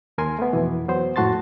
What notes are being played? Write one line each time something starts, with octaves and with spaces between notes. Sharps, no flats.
D#2 A#4 G#5 C6
A3 B3
F2 B2 E3
F#3 B3 C5
F2 A2 F#4 A5 C6 A6